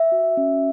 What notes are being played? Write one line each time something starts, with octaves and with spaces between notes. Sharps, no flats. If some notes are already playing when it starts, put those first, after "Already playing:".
Already playing: E5
F#4
C#4